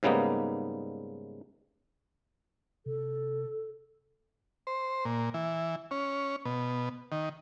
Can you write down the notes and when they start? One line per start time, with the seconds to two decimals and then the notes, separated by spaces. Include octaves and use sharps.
0.03 G#2 C#3 G3 A#3 B3 D#4
2.86 C3 A4
4.67 C5
5.05 A#2
5.34 E3
5.91 C#4
6.45 B2
7.12 D#3